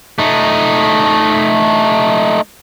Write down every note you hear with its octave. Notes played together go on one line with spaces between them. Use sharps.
A3 D#4